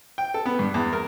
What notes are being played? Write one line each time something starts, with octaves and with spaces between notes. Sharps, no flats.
G5
A4
B3
G2
E2
A#4